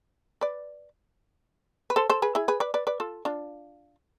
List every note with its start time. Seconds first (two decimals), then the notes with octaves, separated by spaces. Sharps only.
0.41 B4 D5
1.90 B4
1.96 A4 C5
2.10 A4 C5
2.22 G#4 B4
2.35 E4 G#4
2.48 G#4 B4
2.60 B4 D5
2.74 B4 D5
2.87 B4 D5
3.00 F4 A4
3.25 D4 F4